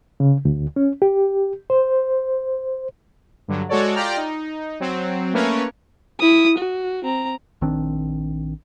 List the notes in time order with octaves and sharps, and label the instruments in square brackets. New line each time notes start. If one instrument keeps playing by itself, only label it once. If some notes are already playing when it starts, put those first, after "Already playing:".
[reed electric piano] C#3
D2
C#4
G4
C5
[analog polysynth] G2 D3 F#3
G#3 F#4 A4 C#5 D5
F4 G4 D5 G5 A#5 F6
D#4
F#3 C4
A3 A#3 C#4 A#4 B4 C#5
[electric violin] E4 D#6
F#4
C4 A#5
[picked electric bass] A#1 D#3 C4 D4